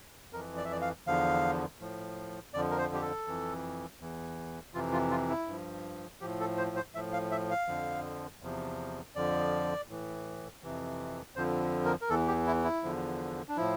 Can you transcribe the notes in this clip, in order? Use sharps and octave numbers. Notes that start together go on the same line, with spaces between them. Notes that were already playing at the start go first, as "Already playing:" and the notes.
F2 E3 A#4
D5
E5
D5
F5
E2 D3 F3 F5
A2 F3
F2 D3 F3 D5
A#4
C5
G4
A4
F2 E3
E2 E3
F2 C3 E3 F4
F4
F4
E4
G2 F3
A2 F3 G4
A4
C5
C5
A2 F3 E5
F5
E5
F5
F2 D3 F3
E2 C3 F3
F2 D3 F3 D5
A2 E3
F2 C3 E3
F2 D3 F3 C5
A#4
A#4
E2 E3 A4
G4
E4
E4
E2 D3 F3
D4
A2 F3 E4